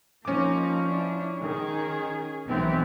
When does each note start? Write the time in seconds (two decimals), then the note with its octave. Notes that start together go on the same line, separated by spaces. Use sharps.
0.25 F3 A#3 C#4 D#4 D6
0.85 D4 E4
1.40 D#3 G#4
2.47 B1 E3 B3 C4 D#4